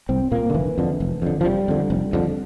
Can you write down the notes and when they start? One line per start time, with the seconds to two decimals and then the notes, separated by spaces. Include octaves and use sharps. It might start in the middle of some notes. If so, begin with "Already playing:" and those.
0.09 C2 C4
0.32 A#2 A#3
0.50 D3
0.54 F1 E3
0.78 F2 D3
1.00 F1
1.22 F2 D3
1.41 F3
1.45 F1 G3
1.68 F2 D3
1.90 F1
2.13 F2 D3